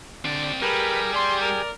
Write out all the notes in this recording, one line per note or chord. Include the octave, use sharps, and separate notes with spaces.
D3 C4 D5
G3 G4 G#4 A#4 B4
D5 C6
A#4